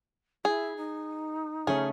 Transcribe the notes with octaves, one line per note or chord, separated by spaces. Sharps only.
E4 G#4
D#4
C#3 A3 C#4 G#4